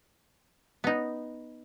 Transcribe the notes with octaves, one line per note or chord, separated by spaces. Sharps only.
B3 D#4